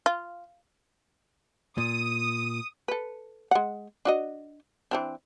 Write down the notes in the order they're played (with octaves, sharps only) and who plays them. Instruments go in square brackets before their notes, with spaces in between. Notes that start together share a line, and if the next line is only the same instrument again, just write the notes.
[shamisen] F4
[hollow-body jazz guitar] A#2 [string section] D#6
[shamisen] A4 B4
G#3 F#5
D4 F#4 D#5
E3 C4 D4